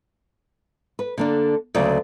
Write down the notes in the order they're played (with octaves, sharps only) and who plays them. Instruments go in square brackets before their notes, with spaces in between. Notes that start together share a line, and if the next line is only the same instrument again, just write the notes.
[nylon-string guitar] B4
D3 A#3 D4
D2 C#3 F#3 A#3 D5